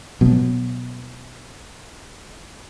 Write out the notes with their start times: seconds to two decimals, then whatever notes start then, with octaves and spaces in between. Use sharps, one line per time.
0.21 B2 F#3